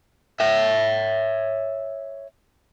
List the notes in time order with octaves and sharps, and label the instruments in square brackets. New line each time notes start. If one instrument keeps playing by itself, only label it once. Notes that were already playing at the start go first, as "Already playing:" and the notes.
[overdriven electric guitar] C#5 E5